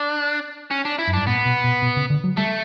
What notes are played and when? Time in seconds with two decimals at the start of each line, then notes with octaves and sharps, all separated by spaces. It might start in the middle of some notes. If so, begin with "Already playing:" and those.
Already playing: D4
0.71 C#4
0.85 D4
0.99 E4
1.07 F#2
1.13 G2 D4
1.27 A2 B3
1.45 B2
1.64 B2
1.82 B2
1.96 C#3
2.10 D3
2.24 F#3
2.37 G3 A3